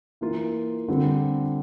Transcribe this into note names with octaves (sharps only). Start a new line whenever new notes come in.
E3 A#3 F4
D3 G3 C4 F4